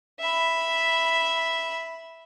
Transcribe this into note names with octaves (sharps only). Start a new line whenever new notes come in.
E5 B5